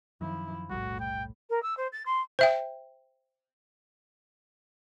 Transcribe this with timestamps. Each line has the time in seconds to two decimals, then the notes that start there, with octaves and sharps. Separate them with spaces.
0.21 F#2 D#3 F3 E4
0.70 F1 B1 A2 G3 F#4
1.00 G5
1.49 A#4
1.62 E6
1.77 C5
1.92 A6
2.05 C6
2.39 C5 E5 G5